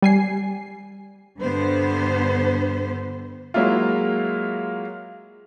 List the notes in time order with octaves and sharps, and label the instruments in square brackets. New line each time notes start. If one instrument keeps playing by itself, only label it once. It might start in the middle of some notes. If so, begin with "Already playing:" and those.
[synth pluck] G3 G#5 C7
[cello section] G2 D3 B3 C5
[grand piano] F#3 G#3 A#3 E4 F4